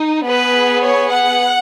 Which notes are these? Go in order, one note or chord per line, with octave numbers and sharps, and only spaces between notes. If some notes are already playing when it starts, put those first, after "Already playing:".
Already playing: D#4
B3 G#4 B4
C#5
F#5